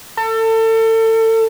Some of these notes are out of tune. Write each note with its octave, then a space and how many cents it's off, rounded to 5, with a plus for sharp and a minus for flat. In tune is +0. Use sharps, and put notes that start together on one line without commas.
A4 +30